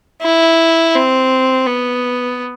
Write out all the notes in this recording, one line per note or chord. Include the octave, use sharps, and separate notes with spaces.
E4
C4
B3